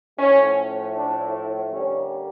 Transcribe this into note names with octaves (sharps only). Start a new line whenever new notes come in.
A2 F3 A3 C#4
D4
G2 D3 G3 A#3 C#4